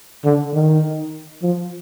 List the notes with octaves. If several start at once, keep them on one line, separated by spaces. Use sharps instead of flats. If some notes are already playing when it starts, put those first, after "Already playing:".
D3
D#3
F3